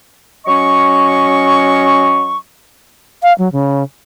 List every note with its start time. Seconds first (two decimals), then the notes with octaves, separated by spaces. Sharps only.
0.46 F#3 C#4 D#5 C#6
3.23 F5
3.38 F#3
3.52 C#3